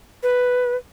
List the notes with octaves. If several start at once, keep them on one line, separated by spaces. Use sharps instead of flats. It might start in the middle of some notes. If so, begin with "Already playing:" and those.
B4